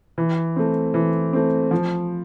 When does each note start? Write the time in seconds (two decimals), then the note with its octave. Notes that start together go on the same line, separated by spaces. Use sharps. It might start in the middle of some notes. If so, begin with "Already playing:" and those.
0.18 E3
0.56 A3 C4
0.94 E3
1.33 A3 C4
1.71 F3